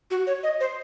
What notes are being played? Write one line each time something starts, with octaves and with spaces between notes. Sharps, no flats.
F#4
C#5
D#5
C5